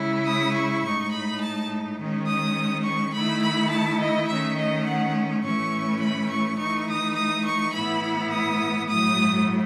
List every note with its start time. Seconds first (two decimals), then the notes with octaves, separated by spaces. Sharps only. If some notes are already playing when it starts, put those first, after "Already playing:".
Already playing: C#3 G#3 C#4 E4
0.27 D#6
0.55 C#6
0.84 A2 G#3 D#4 C#6
1.13 B5
1.42 A5
1.99 D#3 G#3 C#4
2.28 D#6
2.85 C#6
3.15 D#3 A3 E4 B5
3.44 B5
3.72 A5
4.00 D#5
4.30 D#3 A3 C#4 E5
4.58 D#5
4.87 F#5
5.44 A2 E3 A3 C#4 C#6
6.02 B5
6.31 C#6
6.59 E3 A3 D#4 C#6
6.89 D#6
7.16 D#6
7.46 C#6
7.74 A2 E3 B3 E4 B5
8.32 D#6
8.90 A2 F#3 A3 D#6